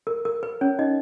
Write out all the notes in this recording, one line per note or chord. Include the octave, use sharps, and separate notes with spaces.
A#4
A#4
B4
C#4 C#5
D#4 D#5